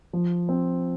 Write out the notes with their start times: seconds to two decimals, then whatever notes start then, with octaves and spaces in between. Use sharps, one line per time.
0.13 F3
0.49 C4